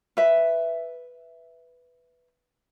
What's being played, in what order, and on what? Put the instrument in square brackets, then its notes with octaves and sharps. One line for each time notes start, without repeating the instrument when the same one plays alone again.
[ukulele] B4 E5